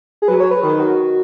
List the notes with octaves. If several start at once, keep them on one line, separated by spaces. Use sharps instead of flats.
G#4
F#3 B4
C#5
B4
D#3 B4
F#4